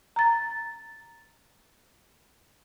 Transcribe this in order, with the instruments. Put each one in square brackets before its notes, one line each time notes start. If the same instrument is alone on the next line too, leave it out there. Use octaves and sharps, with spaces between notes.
[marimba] A#5 A6